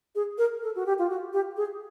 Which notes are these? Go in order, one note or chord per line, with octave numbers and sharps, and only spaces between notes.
G#4
A#4
A4
F#4
G4
F4
F#4
G4
G#4